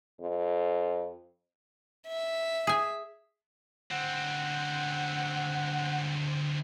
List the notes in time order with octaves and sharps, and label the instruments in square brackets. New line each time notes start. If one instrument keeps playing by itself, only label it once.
[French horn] F2
[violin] E5
[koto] G#4 G#5
[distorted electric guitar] D2 C4 [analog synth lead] F#5